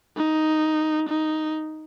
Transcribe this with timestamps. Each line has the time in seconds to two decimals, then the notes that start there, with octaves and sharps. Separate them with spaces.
0.17 D#4
1.09 D#4